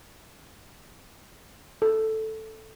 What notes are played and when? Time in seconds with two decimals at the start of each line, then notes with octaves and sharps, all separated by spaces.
1.82 A4